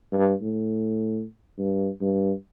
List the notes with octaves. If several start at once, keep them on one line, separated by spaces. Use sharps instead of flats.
G2
A2
G2
G2